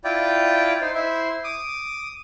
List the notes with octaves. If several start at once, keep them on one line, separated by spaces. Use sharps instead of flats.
E4 F4 D5 G5
D#4 C5
E4 C5 E5
D6 D#6